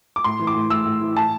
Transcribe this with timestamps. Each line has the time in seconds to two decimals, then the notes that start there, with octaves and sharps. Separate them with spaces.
0.16 D6
0.24 A2 C6
0.39 E3
0.47 D6
0.55 A2
0.70 A2 E6
0.86 A2
1.01 E3
1.16 A2 A5